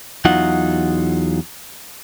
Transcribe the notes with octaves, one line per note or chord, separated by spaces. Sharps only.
E2 F#3 D#4 F4 F#5